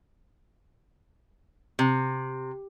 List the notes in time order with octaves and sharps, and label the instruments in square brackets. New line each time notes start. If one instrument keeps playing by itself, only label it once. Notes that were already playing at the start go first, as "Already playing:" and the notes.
[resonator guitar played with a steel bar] C3